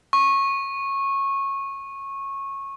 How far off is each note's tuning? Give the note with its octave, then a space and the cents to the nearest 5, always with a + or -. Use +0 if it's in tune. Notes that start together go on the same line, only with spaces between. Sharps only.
C#6 -20